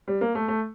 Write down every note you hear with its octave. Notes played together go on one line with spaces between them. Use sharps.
G3
A#3
A3
A3